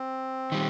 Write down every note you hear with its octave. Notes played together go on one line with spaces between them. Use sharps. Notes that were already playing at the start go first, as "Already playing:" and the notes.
Already playing: C4
D#3 G3